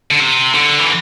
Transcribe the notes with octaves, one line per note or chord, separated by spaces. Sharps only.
D3
C3
D3
E3